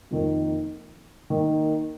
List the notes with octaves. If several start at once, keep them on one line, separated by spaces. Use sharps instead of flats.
F2 D#3 A#3
D#3 A#3